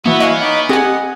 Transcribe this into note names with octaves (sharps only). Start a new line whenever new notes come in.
E3 A#3 B3 E4 F#4
C#5 D#5 F5 G#5 D7
D#4 B5 D6
C4 G4 G#4 D#5 F#5 G#5 D#6